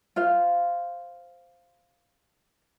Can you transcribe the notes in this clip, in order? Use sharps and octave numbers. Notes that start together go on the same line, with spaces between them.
F4 C5 F5